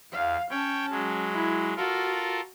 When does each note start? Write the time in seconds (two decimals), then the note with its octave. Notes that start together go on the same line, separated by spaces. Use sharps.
0.12 E2 F5
0.50 C#4 C#5 G5 A5
0.91 F#3 G#3
1.33 E4
1.77 F4 F#4 A4 A#4